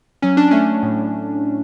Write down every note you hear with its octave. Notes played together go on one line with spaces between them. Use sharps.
F#3 C#4
D4
A3 C#4
A2